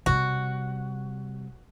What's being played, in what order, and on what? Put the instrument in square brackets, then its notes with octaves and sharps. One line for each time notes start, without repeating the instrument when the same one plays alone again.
[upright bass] C3 G3 [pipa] F#4